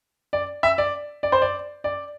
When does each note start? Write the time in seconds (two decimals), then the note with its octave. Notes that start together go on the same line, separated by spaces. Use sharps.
0.33 D5
0.63 E5
0.78 D5
1.23 D5
1.32 C5
1.42 D5
1.84 D5